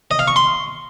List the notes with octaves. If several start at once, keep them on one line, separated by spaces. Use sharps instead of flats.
D#5
F5
C#6
C6